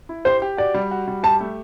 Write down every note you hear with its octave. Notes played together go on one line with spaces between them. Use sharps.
E4
G4 C5
G4
F#4 D5
G3
F#4
G3
G4 A5
A3